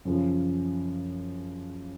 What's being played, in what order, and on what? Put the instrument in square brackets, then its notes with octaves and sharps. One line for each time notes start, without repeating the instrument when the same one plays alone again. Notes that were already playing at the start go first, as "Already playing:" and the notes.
[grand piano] F#2 C#3 F3